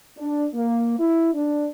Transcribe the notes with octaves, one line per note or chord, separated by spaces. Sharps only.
D4
A#3
E4
D4